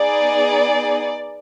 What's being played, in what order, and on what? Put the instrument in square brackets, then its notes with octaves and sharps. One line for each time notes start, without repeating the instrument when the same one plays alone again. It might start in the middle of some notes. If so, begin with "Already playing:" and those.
Already playing: [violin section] B3 D#4 G#4 D5